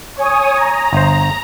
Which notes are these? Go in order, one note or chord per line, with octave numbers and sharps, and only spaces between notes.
C#5 G#5 D#6
A#5
G1 C5